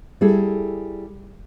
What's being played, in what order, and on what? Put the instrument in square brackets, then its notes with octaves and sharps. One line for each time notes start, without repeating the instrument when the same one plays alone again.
[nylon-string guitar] G3 E4 G#4 A4